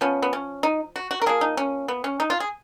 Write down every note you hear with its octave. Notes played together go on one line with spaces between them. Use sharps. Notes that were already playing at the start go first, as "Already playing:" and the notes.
F3 B3 C#4
B3
C#4
D#4
F#4
F#4
A#4
F3 A#3 G#4
D#4
C#4
B3
C#4
D#4
F4
G#4